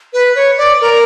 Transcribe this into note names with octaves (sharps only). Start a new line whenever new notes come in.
B4
C#5
D5
A#4